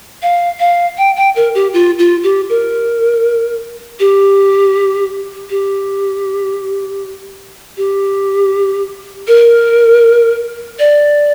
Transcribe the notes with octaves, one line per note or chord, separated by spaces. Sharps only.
F5
F5
G5
G5
A#4
G4
F4
F4
G4
A#4
G4
G4
G4
A#4
D5